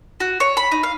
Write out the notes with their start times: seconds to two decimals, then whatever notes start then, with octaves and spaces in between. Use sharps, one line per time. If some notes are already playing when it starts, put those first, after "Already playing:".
0.20 F#4
0.40 C#5
0.57 B5
0.72 D#4
0.83 F5